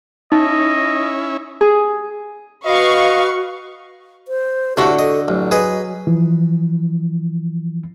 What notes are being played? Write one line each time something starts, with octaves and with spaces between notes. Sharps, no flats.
C#4 D#4 E4 D#5
G#4
F#4 B4 D#5 F5 C#6
C5
A2 D3 A3 F#4 G4 F#5
A4 D#5
A1 F#3
G#4 B4 D#5
E3 F3